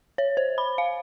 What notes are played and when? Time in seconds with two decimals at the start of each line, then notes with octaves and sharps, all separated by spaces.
0.18 C#5
0.37 C5
0.58 B5
0.78 F5